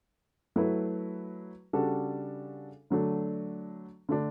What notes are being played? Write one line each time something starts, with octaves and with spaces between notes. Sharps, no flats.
F#3 A3 E4 B4
C#3 G3 D4 F#4 A4
D3 F#3 A3 D4
D3 A3 D4